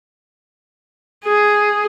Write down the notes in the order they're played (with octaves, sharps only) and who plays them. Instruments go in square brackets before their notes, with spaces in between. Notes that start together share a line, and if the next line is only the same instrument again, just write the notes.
[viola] G#4